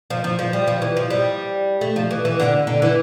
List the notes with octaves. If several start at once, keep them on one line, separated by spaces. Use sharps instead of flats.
F3
F3
F3
G3
F3
E3
F3
G3
A3
F3
E3
E3
D3
D3
E3